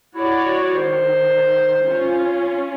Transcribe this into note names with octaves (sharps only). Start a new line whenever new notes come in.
E4 F#4 C#5 D5
D#3 C5
C#4 F4